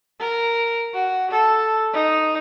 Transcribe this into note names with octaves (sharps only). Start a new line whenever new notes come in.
A#4
F#4
A4
D#4